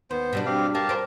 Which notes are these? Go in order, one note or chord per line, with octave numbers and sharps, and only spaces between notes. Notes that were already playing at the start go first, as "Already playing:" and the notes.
D#2 B3 C5
B2 G3 D4
C4 G4 F5
G4 A#4 F5 A5
A#4 C5